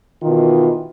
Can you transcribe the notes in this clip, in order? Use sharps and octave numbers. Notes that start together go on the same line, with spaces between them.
B2 D#3 E3 F4